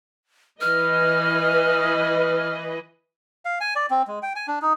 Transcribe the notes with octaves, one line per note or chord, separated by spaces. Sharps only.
E3 B4 D#5 F6
F5
G#5
D5
C4
G#3
G5
G#5
D4
D#4